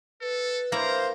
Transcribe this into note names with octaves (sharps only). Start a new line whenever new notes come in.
A4 B4
A#3 E4 C5 F5 A#5